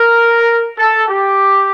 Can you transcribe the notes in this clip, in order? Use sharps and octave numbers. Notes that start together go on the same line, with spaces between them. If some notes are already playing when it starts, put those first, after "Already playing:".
Already playing: A#4
A4
G4